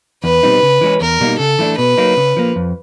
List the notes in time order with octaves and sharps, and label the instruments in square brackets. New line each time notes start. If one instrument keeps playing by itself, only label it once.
[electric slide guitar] E2 [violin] B4
[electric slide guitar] B2 G3 C4 D#4
C#3
E3 G#3 C#4
[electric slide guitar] E2 [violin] A#4
[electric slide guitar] B2 G3 A#3 D#4
[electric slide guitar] C#3 [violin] A4
[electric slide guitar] E3 A3 D4
[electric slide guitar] B2 [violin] B4
[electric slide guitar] F#3 A#3 D#4
C#3
F3 A#3
F2